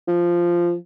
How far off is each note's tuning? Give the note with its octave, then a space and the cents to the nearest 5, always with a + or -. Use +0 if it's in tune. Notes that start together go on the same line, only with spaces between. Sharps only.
F3 -10